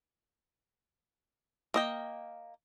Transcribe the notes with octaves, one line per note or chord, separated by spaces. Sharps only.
A#3 D#5 G5